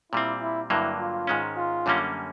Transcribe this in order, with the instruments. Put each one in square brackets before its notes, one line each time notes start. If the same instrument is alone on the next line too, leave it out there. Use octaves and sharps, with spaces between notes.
[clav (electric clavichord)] A#2 G3 C4 [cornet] E4
[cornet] E4
[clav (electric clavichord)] G2 D3 F#3 A#3 [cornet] E4
[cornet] F4
[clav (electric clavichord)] G#2 D#3 G#3 C#4
[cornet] F4
[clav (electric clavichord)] F#2 D3 G3 A#3 C#4